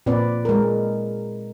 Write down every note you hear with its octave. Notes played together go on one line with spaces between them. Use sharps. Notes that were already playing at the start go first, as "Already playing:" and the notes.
A#2 C4 B4 D5
G#3 A#4